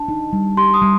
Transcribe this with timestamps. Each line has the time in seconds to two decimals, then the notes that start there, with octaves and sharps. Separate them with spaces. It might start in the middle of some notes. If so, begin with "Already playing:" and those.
Already playing: D4 A5
0.08 D#4
0.33 G3
0.57 G4 C6
0.74 D#6
0.82 G3